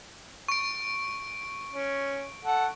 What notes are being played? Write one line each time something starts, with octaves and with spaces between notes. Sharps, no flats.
C#6 D7
C#4
A4 F#5